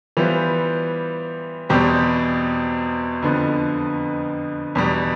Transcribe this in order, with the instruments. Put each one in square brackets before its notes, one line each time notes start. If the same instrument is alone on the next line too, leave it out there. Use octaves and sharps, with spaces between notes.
[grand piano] E3 G3 B3 F4 C5
E2 B2 G3 C4 G4
F2 D3 F3 B3
E2 B2 G3